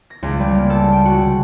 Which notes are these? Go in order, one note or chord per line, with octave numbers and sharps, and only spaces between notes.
A#6
C#2
G3
A#3
A4
G5
F#4
D3